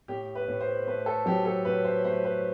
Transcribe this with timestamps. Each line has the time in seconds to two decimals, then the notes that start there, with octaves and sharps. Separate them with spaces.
0.08 A2 G4
0.35 B4
0.48 A2
0.61 C5
0.87 A3 B4
1.06 A4
1.26 F#3 G4
1.45 A4
1.65 A2 B4
1.84 C5
2.05 A3 C5
2.24 B4